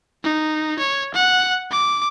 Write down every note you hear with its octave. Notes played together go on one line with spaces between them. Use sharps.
D#4
C#5
F#5
D6